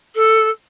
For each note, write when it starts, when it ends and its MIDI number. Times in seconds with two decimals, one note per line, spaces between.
0.15 0.48 69